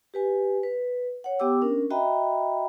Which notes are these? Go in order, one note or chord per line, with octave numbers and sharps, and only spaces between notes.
G4 B4 G#5
B4
C#5 F#5
B3 G4 G5 D6 E6
C#4 D4 A#4
F#4 D#5 E5 G5 A#5 B5